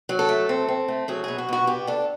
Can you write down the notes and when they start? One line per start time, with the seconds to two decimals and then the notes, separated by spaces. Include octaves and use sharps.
0.09 F#3
0.19 A4
0.29 A3
0.49 C4
0.68 C4
0.88 A3
1.08 F#3 G#4
1.24 B2 G#4
1.38 F#4
1.49 B2 F#4
1.67 B3 G4
1.87 D4 A4